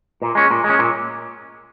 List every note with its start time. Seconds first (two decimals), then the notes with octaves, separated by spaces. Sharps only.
0.22 A#2
0.35 G#3 C#4
0.51 A#2
0.64 G#3
0.69 C#4
0.79 A#2